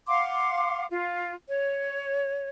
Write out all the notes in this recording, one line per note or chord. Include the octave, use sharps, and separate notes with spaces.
F5 F#5 C6 D6
F4
C#5